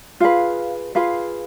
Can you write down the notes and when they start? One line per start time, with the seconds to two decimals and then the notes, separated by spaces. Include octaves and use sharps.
0.20 F4 G#4 B4 F5
0.95 F4 G#4 B4 F5